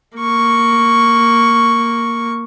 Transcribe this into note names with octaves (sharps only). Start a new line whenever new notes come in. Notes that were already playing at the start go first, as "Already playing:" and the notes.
A#3 C#6